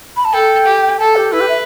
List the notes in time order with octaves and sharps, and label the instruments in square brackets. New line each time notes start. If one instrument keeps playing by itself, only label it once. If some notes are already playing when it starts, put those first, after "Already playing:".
[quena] B5
A5
[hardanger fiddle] A4 [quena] G5
[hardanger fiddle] G4
[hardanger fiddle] A4 [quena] A5
[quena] G4
[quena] E4 [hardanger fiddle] B4
[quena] G4
E5